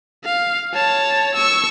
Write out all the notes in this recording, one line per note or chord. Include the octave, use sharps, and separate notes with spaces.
F5
C#5 A5
C#6 E6